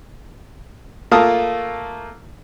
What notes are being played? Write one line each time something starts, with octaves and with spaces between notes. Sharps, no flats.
A3 A#3 F4 A5 D#6 F6